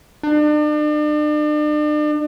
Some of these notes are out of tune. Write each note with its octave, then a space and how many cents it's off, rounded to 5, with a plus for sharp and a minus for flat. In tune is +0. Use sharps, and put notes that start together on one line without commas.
D4 +40